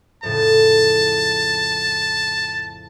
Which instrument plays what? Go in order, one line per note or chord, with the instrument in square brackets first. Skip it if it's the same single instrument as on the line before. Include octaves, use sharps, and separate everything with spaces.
[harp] F2 A2 C#3 [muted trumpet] A5